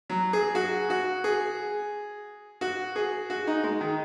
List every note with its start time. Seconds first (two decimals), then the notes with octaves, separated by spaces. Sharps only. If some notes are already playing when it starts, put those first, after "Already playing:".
0.10 F#3
0.33 G#4
0.55 F#4
0.90 F#4
1.24 G#4
2.61 F#4
2.96 G#4
3.30 F#4
3.47 D#4
3.64 G#3
3.81 D#3